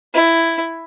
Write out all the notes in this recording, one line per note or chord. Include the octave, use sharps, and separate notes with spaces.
E4